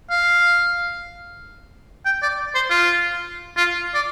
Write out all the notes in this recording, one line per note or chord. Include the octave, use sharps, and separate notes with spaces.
F5
G5
D5
C5
F4
F4
D5